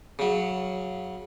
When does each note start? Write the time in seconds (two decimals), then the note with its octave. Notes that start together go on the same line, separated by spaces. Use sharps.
0.19 C#3 F#3